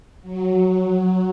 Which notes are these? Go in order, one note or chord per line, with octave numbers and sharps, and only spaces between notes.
F#3